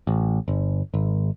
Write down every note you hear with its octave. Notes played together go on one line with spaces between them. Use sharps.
A1
G1
G#1